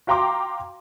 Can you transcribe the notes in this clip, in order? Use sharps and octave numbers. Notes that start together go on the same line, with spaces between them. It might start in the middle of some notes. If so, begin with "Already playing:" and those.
F#4 F5 G5 A#5 C6 D6